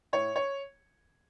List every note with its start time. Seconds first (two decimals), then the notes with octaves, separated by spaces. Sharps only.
0.13 A2 C#5
0.36 C#5